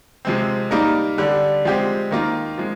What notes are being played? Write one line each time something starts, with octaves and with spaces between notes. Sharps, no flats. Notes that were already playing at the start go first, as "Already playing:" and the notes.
C3 F3 G#3 C4
G3 A#3 D#4 A#4
D3 G3 D4
F3 G#3 C4 G4
D#3 A#3 F4
F3 G#3